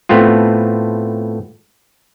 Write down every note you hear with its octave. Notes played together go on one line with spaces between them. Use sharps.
A2 A3 B3 C4 F4